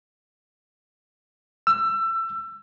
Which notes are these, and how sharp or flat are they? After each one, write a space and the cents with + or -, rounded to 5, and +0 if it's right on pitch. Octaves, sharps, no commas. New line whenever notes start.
E6 +25